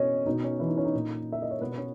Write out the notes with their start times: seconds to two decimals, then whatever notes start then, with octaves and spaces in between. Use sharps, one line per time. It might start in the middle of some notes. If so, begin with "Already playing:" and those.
Already playing: B2 C#4 C#5 D#5
0.26 B2 D#4
0.44 C#4
0.60 E3 E4
0.68 D#4
0.77 C#4
0.85 D#4
0.94 A#2
1.32 E5
1.42 D#5
1.51 C#5
1.61 B2 B3 B4
1.72 B4
1.78 C#4 C#5